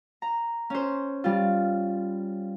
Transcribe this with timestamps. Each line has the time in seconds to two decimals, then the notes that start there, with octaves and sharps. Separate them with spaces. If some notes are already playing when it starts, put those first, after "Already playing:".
0.22 A#5
0.70 C#4 C5
1.24 G3 F4